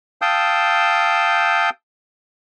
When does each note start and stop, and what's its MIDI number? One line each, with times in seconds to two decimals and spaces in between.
0.22 1.70 77
0.22 1.70 79
0.22 1.70 81
0.22 1.70 87
0.22 1.70 88
0.22 1.70 91